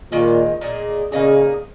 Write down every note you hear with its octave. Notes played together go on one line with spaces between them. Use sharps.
A#2 D#3 G#3 F4
A#2 A#3 D#4 G#4
A#2 C#3 A#3 D#4 G#4